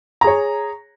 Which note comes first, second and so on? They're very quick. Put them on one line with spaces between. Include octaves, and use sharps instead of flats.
A#5 G#4 C#5